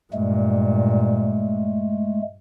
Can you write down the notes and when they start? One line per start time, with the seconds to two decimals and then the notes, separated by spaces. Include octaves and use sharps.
0.13 G2 A#2 G#3 A3